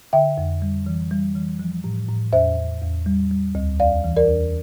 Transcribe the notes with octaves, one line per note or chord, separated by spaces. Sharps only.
D3 E5 G5
F2
G3
E3
G3
E3
F3
A2
A2
E2 C5 E5
E2
E2
G3
G3
D2
E2 D5 F5
E3
A#4 D5
E2